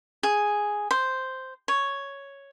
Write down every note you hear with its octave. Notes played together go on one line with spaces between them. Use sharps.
G#4
C5
C#5